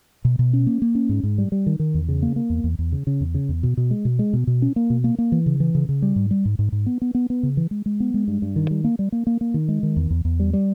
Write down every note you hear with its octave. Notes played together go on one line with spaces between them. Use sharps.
B2
B2
C#4
A#3
A#3
C#4
G#2
G#2
G3
G3
D#3
D#3
E2
C#3
A#3
A#3
E2
E2
E2
C#3
C#3
E2
C#3
E2
B2
B2
G#3
B2
G#3
B2
B2
C#4
A#3
B2
A#3
A#3
E3
C#3
E3
C#3
C#3
G3
G#2
G3
G#2
G#2
G#2
B3
B3
B3
B3
C#3
E3
G#3
G#3
B3
G#3
G2
G2
D#3
G3
A#3
G3
A#3
A#3
A#3
D#3
G#3
D#3
E2
E2
E2
G3
G3